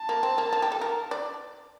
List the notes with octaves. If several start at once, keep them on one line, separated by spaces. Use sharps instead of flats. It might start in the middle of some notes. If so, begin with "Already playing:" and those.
Already playing: A5
A#3
C4
A#3
A#3
G4
A4
A#4
D5